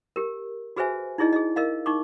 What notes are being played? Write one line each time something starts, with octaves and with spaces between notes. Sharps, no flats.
G4 A#4
F#4 G#4 B4 C5 E5 G#5
D#4 E4 G#4 D5 D#5
G#4 D#5
A#4 D#5 F5
D#4 C#6 D6